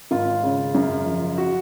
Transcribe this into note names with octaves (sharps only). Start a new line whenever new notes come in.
G#1 F4
C#3
F#2
F3
F#4